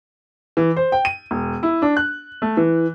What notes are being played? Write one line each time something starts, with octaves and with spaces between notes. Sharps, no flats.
E3
C5
G5
D#7
E1
E4
D4
F#6
A3
E3